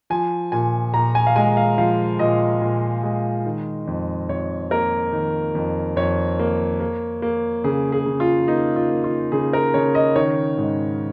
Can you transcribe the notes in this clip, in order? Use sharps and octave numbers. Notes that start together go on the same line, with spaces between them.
F3 G#5
A#2 G#5
A#2 A#5
G#5
F5
G#3 G#5
F5
F3 F5
A#2 D#5
A#2
G#3
D#3
F2
F2 C#5
A#3 A#4
D#3
F2
F2 C#5
A#3
A#3
A#3
C#3 G#4
G#4
C#3
F4
A#3 D#4
F4
A#3
F4
C#3 G#4
A#4
C#3 C#5
D#5
D#3 C#5
G#2